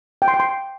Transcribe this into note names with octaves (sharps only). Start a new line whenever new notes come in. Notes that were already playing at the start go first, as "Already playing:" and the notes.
G5
C6
G5
C6